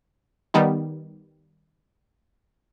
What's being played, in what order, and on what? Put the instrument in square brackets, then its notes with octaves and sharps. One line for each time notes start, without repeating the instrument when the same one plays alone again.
[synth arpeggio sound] D#3 G3 B3 D#4